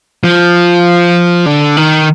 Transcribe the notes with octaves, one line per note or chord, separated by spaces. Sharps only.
F3
D3
D#3